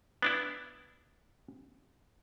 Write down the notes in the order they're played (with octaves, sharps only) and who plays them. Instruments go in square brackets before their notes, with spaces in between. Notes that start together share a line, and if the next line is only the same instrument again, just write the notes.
[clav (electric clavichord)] B3 D4 E4